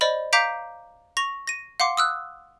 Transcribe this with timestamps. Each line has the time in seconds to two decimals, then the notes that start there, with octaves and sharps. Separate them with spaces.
0.01 C5 D5 D#5 B5
0.33 F5 A#5 D6 G6 B6 D7
1.17 C#6 A#6 F7
1.47 A#6 D#7
1.80 F5 F#5 C6 D6
1.97 D#6 E6 F#6